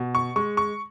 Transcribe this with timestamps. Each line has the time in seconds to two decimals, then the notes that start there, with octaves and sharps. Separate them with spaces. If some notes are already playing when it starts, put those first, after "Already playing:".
Already playing: B2
0.15 C#6
0.36 G#3 C#6
0.57 C#6